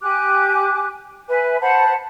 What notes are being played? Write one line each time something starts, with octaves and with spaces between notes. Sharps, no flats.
G4 G#5 D6 F#6
B4 E5 G#5
C5 F#5 A5 B5